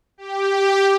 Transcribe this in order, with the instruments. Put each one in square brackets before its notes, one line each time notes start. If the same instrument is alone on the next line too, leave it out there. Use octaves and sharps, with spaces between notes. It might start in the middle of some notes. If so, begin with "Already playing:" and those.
[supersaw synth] G4